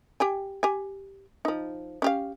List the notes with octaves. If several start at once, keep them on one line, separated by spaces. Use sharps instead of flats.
G4 G5 G#5
G4 G#5
F3 D#4
C#4 G4 F5